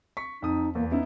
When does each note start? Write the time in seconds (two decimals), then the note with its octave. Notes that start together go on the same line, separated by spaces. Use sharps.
0.17 C#6 B6
0.42 F2 D#4 D#6
0.75 E2 A#3
0.91 B3 C#4 D#4 E4